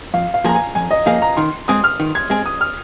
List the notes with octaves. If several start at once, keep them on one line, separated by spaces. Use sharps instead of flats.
F2 F5
F5
F3 A#3 G#4 A#5
G#5
F2 G#5
D#5
F3 A#3 G#4 F5
A#5
D#3 C6
G#3 C4 G#4 D#6
F6
D#3
G#6
G#3 C4 G#4
D#6
F6